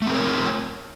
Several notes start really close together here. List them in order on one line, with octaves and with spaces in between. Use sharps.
A3 C4 A#4 C#5